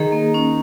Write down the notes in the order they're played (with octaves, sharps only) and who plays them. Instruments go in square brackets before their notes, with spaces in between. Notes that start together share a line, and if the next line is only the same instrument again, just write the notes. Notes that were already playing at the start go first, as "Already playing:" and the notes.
Already playing: [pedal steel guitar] D#3 D#4 [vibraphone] G#4
[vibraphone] A#3
C#4